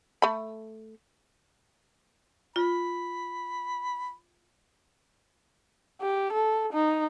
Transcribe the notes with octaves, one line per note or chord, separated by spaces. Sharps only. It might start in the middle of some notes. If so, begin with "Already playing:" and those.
A3 B5
F4 B5
G4
A4
D#4